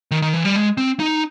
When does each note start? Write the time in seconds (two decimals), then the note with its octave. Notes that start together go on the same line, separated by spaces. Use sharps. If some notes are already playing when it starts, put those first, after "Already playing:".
0.11 D#3
0.22 D#3
0.33 E3
0.44 G3
0.56 G#3
0.78 C4
1.00 D#4